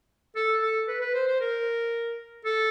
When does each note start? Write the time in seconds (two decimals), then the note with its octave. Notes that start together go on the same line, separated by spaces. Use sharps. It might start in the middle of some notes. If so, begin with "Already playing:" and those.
0.36 A4
0.62 A4
0.88 B4
1.01 B4
1.14 C5
1.27 C5
1.40 A#4
2.45 A4